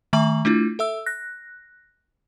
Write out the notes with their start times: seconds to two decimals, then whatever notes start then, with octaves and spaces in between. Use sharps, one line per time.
0.13 D#3 A3 E5 A#5 C#6 F#7
0.45 A3 D4 E4 F4
0.79 A4 E5 E6
1.06 F#6 A#6